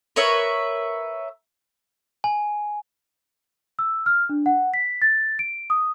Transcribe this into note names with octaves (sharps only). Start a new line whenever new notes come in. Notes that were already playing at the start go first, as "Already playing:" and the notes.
A#4 B4 C#5 E5
G#5
E6
F6
D4
F#5
B6
A6
D7
D#6